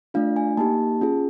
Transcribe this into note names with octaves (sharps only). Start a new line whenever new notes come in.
A3 D4 F4 F5
G#5
A#3 D#4 G4 A5
C#4 F4 G#4